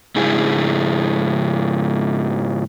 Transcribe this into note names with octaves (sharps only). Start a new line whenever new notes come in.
G#2 C#3 E4 G#4